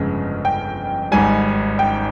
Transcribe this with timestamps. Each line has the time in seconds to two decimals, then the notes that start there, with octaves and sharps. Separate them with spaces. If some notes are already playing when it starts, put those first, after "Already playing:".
Already playing: G1 F2 C#3 G#3
0.45 G5
1.12 G#1 G#2 G3 G#5
1.79 G5